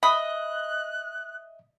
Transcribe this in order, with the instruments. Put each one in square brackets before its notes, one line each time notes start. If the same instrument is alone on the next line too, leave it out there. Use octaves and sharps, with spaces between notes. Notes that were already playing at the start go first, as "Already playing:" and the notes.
[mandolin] D#5 [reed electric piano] E5 [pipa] B5 [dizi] F#6